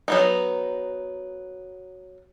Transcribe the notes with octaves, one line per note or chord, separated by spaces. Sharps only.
F#3 B3 D#4